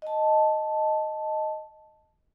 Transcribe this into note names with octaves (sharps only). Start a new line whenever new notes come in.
D#5 A5